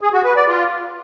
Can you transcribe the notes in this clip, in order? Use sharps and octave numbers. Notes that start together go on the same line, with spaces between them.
G#4
F#4
B4
D5
F4